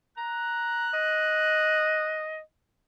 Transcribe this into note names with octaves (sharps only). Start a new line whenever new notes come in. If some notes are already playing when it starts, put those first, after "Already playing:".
A#5 F#6
D#5